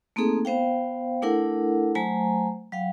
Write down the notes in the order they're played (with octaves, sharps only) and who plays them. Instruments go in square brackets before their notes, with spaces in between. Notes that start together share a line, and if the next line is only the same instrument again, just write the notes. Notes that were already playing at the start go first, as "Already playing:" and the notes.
[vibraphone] A3 A#3 C4 D#4 G#4 A4
B3 C5 F5 G5
A3 D4 E4 A4 A#4 F#5
F#3 A3 C5 G#5 A#5
F#3 F5 G5